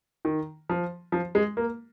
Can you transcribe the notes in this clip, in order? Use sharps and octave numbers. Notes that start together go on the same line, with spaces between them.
D#3
F3
F3
G#3
A#3